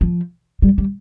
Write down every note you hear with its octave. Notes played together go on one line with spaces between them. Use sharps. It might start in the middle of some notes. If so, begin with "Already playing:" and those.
F3
G3
G3